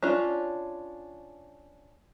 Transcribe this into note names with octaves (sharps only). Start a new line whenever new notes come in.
C#4 D4 F4